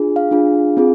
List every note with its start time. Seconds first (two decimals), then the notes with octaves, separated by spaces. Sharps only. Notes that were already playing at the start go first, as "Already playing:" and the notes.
Already playing: D4 F4 G#4
0.16 F5
0.31 D4 F4 G#4
0.77 C4 F4 G#4